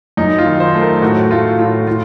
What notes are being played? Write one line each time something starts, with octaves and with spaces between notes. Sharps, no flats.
F#2 D#4
F4
D#3
C5
A3
A#4
A2 F#4
A3 F4
A2 F4
A2 F4